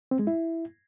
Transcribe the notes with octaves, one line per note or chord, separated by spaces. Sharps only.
C4
G#3
E4